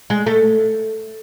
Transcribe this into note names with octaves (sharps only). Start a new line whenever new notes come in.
G#3
A3